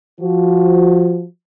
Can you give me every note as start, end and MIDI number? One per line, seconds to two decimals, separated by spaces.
0.21 1.25 53
0.21 1.25 66